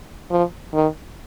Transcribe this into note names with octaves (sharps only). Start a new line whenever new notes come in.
F3
D#3